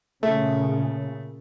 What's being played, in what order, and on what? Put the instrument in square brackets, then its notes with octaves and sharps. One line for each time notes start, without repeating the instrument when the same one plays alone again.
[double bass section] A#2 C#3 [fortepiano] A3